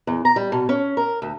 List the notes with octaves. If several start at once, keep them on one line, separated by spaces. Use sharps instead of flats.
E2
A#5
G3
B2
C#4
A#4
D2